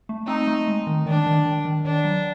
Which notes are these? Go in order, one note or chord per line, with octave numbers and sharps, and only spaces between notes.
A3
C4 D#4
A3
G#3
D#3
D#3 D4
D#3
D#3
D#3
D#3 D4
F#3